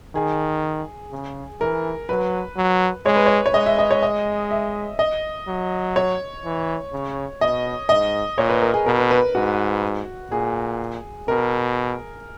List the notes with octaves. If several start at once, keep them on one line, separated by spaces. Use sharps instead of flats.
D#3 G#4
C#3
E3 A#4
F#3 B4
F#3
G#3 C#5
B4
C#5
C#5
G#3 D#5
E5
D#5
C#5
D#5
E5
D#5
F#3
C#5
E3
C#3
B2 D#5
G#2 D#5
A#2 C#5
B4
A#4
G#4
B2 A#4
B4
B4
G#2 F#4
A#2 G#4
B2 A#4